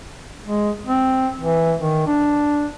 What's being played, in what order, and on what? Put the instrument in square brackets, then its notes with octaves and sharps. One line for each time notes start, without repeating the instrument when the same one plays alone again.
[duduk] G#3
C4
E3
D#3
D4